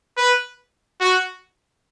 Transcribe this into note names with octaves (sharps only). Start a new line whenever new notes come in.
B4
F#4